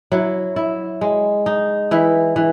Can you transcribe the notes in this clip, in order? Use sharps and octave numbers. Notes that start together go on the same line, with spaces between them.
F#3 E4
E4
G#3
D#4
E3 E4
E3